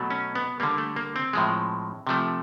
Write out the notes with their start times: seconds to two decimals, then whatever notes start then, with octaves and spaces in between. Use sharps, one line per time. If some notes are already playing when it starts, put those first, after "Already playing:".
Already playing: B2 F#3 A3
0.11 C#4
0.35 B3
0.60 D3 G3 A#3
0.78 A3
0.96 A#3
1.16 C4
1.33 A2 F3 G#3
2.07 C3 F3 A3